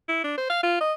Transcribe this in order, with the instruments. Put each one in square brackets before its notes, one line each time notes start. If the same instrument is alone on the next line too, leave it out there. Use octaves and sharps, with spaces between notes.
[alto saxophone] E4
D4
C5
F5
F4
D#5